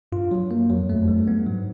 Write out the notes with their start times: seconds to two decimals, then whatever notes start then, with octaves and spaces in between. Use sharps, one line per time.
0.12 G2 F4
0.31 F#3
0.51 A#3
0.70 F2 F#3
0.83 E2
0.89 A3
0.96 F2
1.08 G2 G3
1.28 B3
1.47 G#2 F#3